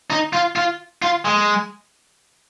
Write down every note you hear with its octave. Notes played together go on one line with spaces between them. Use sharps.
D#4
F4
F4
F4
G#3